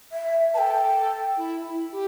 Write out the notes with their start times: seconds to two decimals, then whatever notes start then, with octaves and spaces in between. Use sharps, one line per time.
0.12 E5
0.54 B4 A5
0.58 A4 G5
1.37 E4
1.65 E4
1.92 G4